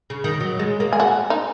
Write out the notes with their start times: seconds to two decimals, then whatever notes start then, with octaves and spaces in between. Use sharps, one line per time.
0.10 C#3
0.24 D#3
0.40 F#3
0.59 G#3
0.80 A#3
0.93 G#4
1.00 F#4
1.30 D#4